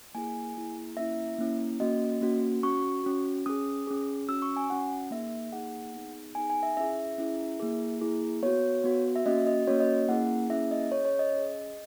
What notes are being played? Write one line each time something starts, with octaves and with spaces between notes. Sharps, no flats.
A#3 E4 G#4 G#5
A#3 E4 G#4
A#3 C#4 E4 E5
A#3 C#4 E4
A#3 C#4 F#4 D#5
A#3 C#4 F#4
C#4 F#4 C#6
C#4 F#4
C#4 G#4 D#6
C#4 G#4
C#4 F#4 E6
C#6
G#5
C#4 F#4 F#5
A#3 D#4 G#4 E5
A#3 D#4 G#4 F#5
B3 D#4 G#4
B3 D#4 G#4 G#5
G#5
E5
C#4 E4 G#4 E5
C#4 E4 G#4
A#3 E4 G#4
A#3 E4 G#4
B3 F#4 C#5
B3 F#4
E5
A#3 C#4 F#4 D#5
D#5
A#3 C#4 F#4 C#5
D#5
A#3 C#4 E4 G#4 F#5
A#3 C#4 E4 G#4 E5
D#5
C#4 G#4 C#5
C#5
D#5
C#4
G#4